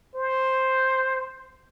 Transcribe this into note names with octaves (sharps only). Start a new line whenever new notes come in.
C5